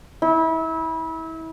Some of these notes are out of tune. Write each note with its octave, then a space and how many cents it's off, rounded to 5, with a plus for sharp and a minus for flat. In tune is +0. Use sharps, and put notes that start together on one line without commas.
E4 -30